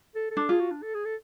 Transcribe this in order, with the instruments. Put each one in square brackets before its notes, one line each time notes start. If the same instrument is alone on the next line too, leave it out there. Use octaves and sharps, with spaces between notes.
[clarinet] A4
A4
[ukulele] D4
[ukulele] F4 [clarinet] G#4
[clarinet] F#4
D4
A4
G#4
A4